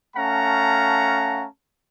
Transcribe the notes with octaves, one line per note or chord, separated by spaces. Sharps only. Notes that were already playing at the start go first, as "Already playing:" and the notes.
A3 C#4 F5 F#5 A5 A#5